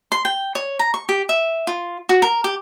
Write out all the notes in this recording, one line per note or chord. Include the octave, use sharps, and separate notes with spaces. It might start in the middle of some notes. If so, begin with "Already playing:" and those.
C6
G5
C#5
A#5
C#6
G4
E5
F4
F#4
A#4
G4